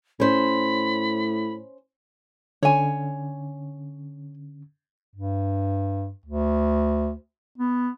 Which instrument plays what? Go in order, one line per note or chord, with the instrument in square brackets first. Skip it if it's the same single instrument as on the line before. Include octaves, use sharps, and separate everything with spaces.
[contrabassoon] A2 [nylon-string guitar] C#4 C5 [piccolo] B5
[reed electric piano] D3 C#4 [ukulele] C#5 G#5
[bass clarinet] G2
D2
B3